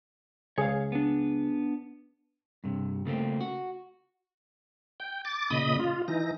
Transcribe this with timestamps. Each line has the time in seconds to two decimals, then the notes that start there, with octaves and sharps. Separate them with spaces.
0.58 C#2 G#4 C#5 F5
0.92 B3 D4
2.64 G2 C3
3.05 C#3 A3 A#3 C4
3.41 F#4
5.00 G5
5.25 D6 A6
5.50 A#2 C#3 D#5 B5 D#6
5.79 F4
6.08 E3 D#4 A#6